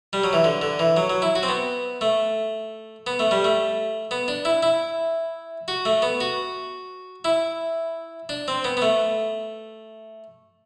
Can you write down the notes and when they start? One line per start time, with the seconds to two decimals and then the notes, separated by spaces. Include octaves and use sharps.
0.13 G3
0.24 F#3
0.33 E3
0.44 D3
0.62 D3
0.79 E3
0.97 F#3
1.10 F#3
1.22 E4
1.36 F#4
1.43 C4
1.49 B3
2.01 A3
3.07 B3
3.19 A3
3.31 G3
3.45 A3
4.11 B3
4.28 D4
4.45 E4
4.63 E4
5.68 F#4
5.85 A3
6.02 B3
6.21 F#4
7.25 E4
8.29 D4
8.48 C4
8.64 B3
8.77 B3
8.82 A3